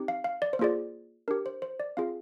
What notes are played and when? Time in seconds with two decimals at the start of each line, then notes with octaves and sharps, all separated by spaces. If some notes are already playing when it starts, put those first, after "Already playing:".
Already playing: C4 D#4 G4
0.08 F5
0.24 F5
0.42 D5
0.53 C5
0.59 A#3 F4 G#4 D5
1.28 D4 G4 A#4
1.46 C5
1.62 C5
1.80 D5
1.97 C4 F4 G#4 F5